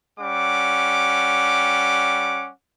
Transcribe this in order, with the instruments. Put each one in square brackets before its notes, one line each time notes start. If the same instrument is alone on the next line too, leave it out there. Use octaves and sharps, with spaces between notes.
[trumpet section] G3 C#4 F#5 D6